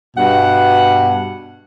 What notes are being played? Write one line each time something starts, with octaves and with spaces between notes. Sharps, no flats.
G2 B2 F#5